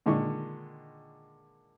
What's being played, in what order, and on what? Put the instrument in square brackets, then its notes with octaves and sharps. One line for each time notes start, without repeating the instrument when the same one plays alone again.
[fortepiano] A#2 D3 D#3 G#3 C#6